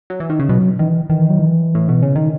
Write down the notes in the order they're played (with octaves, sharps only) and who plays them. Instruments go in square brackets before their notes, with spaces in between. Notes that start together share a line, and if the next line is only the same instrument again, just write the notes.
[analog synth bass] F#3
E3
D#3
C#3
[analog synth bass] B2 [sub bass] F#3
[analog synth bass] D#3 [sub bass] E3
[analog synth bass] D#3 [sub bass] E3
[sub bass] F#3
E3
[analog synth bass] A2
B2
C#3
D#3